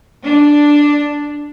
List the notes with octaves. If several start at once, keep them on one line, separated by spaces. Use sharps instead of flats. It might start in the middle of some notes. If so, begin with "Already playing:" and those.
D4